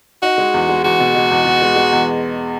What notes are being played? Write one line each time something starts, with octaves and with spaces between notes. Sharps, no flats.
D#4 F#4
G#3
E2
G#3
E2 F#4
B2
G#3
E2
B2
G#3
G#3
E2